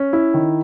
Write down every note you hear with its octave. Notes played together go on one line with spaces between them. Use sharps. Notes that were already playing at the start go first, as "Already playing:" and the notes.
Already playing: C#4
E4
D#3